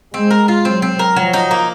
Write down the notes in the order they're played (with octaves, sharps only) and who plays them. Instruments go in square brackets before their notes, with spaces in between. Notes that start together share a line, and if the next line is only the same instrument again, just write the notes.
[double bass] G#3 [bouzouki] C4
[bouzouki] A#4
F4
[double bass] F#3 [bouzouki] C4
[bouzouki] C4
A#4
[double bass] F3 [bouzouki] F#3
[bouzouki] D#4
A#3